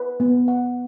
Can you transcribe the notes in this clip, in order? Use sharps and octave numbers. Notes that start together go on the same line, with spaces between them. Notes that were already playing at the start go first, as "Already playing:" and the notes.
Already playing: B4
B3
F#5